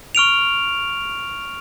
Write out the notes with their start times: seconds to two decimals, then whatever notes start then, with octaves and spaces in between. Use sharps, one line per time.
0.15 C#6 F6 D7 F7